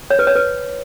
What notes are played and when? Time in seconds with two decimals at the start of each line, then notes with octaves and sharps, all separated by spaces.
0.10 C#5
0.19 B4
0.27 C#5
0.35 B4